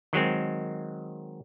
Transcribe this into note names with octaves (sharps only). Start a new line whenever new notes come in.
D#3 F#3 G#3 C4